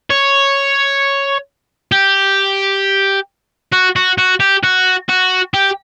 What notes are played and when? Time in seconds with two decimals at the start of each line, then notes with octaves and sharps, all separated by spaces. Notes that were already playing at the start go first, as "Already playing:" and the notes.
0.11 C#5
1.92 G4
3.72 F#4
3.96 F#4
4.18 F#4
4.40 G4
4.64 F#4
5.09 F#4
5.54 G4